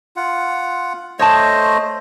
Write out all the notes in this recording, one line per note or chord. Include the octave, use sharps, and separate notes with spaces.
F4 F#5
A3 C5 C#5 D#5 A5